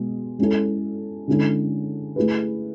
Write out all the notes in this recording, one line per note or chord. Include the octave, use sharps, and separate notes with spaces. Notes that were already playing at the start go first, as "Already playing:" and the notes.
Already playing: B2 G#3 B3
G#3 C#4 E4 A4
D3 G#3 C#4 E4 A4
A3 E4 G#4 B4